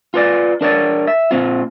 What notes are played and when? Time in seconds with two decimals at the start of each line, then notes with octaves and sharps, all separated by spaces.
0.14 F4 B4 D5
0.61 D4 A#4 C#5 D5
1.07 E5
1.31 A#2 C4 F4